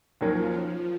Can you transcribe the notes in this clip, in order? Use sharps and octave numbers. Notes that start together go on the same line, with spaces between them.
D#2 D#3 F3 F#3 C#4
F3